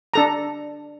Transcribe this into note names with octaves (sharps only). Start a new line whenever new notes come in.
D4 A4 A#5